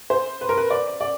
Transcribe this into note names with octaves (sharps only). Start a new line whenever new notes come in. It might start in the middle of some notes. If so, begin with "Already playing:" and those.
C5
B4
A#4
B4
D5
D5